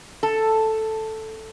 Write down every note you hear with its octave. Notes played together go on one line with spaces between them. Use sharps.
A4